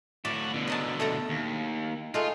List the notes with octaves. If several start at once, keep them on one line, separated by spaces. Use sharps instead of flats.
A2 F#4 D5 E5
B2 D3
F#3 D#5 A5
A3 A4 A#5
D#2
G#3 A3 D#4 F4